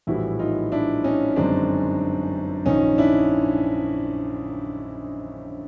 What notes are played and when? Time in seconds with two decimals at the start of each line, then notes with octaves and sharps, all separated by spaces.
0.07 A#1 A2 E3 G3 E4 F#4
0.39 D#4 F4
0.72 D4 E4
1.04 C#4 D#4
1.36 G1 F#2 D#3 G#3 C4 D4
2.66 A#1 G#2 D#3 C#4 D#4
2.98 D4 E4